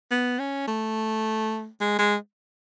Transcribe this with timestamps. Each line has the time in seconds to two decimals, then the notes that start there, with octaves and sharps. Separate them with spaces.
0.11 B3
0.39 C#4
0.68 A3
1.81 G#3
1.99 G#3